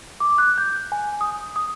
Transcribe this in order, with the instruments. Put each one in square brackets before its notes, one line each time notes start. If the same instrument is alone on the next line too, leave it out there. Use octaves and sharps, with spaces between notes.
[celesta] D6
F#6
G6
G#5
D#6
D#6